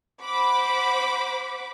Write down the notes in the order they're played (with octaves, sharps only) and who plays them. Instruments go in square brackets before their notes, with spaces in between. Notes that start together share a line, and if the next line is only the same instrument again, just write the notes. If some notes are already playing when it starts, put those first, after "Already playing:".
[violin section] C5 F#5 B5 D6